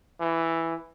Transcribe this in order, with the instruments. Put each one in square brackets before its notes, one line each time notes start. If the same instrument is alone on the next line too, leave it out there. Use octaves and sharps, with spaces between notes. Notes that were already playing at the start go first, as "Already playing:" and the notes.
[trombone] E3